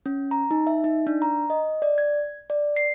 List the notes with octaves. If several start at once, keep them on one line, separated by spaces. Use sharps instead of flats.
C#4
A#5
D#4
E5
D#4
D4
A#5
D#5
D5
G#6
D5
C7